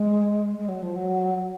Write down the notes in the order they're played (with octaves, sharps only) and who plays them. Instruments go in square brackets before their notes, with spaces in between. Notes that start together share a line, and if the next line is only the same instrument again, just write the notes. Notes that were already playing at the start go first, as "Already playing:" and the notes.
Already playing: [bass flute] G#3
G#3
F#3
F3
F#3